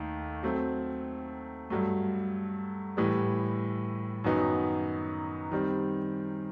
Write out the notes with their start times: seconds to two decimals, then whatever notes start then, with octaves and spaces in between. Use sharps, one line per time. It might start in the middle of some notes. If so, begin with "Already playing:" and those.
Already playing: D#2 D#3 A3
0.43 F#3 A3 C4
1.70 G2 F#3 A3
2.97 A2 E3 G3
4.24 F#2 D#3 F#3 B3 D#4
5.52 D#3 G3 C4